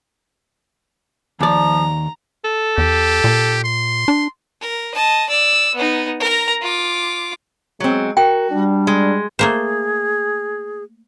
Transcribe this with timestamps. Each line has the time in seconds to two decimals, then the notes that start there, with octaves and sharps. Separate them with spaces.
1.41 D#2 F3 D5 A#5
2.45 A4
2.78 E2 G4
3.24 A#2
3.64 C6
4.08 D4
4.61 A#4
4.95 D#5 A5
5.29 D5 E6
5.75 B3 D#4
6.20 A#4 A#5
6.62 F4 D6
7.80 F#3 G#3 C4
8.17 F#4 A#4 G5
8.51 G3 D4
8.87 G#3
9.39 A3 A#3 G#4 C5